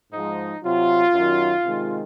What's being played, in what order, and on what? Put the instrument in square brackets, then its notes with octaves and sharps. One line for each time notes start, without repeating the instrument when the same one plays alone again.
[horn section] G#2 F3 G#3 D#4
C3 F#3 F4
F#2 D#3 F#3
C3 D#3 G#3